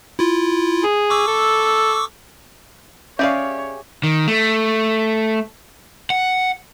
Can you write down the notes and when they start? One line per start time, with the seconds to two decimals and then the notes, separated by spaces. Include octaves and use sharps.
0.19 E4 F4
0.84 G#4
1.10 C#6 D6 E6
1.28 A4
3.19 C#4 G4 G#4 C#5 D5 E5 F5
4.04 D#3
4.28 A3
6.10 F#5